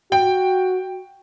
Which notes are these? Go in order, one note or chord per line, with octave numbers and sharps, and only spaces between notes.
F#4 G5